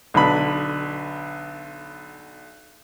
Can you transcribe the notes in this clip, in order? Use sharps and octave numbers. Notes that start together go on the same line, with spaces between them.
B1 D3 B5